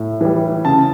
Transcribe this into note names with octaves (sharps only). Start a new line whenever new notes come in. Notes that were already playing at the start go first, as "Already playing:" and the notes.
Already playing: A2
E3 G3
C#3 A5